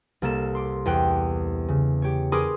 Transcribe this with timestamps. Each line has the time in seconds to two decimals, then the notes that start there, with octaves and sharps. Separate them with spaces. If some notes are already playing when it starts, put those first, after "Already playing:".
0.22 C2 A#3 A4 E7
0.55 C6 D6
0.86 E2 C5 G5 F#6
1.68 C#3
2.02 G4 C#5
2.32 G#4 A#4 B4 C6 D6 D#6